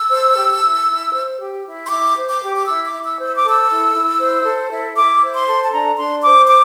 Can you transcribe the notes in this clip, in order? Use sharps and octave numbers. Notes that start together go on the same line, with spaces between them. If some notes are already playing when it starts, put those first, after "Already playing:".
Already playing: E6
C5
G4
E4
E4
C5
G4
E4
C6
E4 D6
C5
D6
G4
D6
E4 E6
D6
E4
E6
C5
E6
D6
A4
E6
E4
E4
C5
A4
E4
E4 D6
C5
C6
A4
A5
D4 A#5
D4 C6
C5 D6
D6